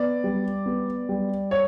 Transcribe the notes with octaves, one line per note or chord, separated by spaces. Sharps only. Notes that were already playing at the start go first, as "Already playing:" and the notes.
Already playing: B3 D5
G3
B3
G3
C#5